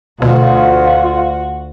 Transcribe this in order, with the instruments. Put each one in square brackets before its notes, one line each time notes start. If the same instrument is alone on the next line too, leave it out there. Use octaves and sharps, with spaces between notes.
[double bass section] D2 [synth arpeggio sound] B2 [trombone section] F4 [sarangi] F#4